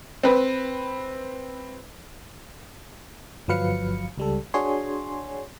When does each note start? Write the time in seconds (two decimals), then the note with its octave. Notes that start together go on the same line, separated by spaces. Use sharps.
0.23 C4 B4
3.48 G1 F3 F#3 B4 F5 C#7
4.18 C#2 G3 A4
4.54 D4 F#4 G#4 C#5 G#5 C6